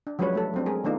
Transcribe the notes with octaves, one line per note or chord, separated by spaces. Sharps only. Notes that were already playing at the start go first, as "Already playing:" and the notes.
D4
F3 F#3 G#3 C#4 B4 C#5
G3 A3 A4
F#3 C4 D4
G#3 G#4 A#4
D#3 A3 B3 D4 D#4 F4